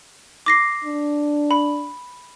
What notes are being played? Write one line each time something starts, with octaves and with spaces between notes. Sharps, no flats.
D6 A#6 C7
D4
B5